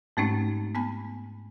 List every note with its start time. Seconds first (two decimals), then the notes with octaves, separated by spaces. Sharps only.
0.17 G#2 G#3 A3 C4 C#4 D#4
0.75 B3 G#5 B5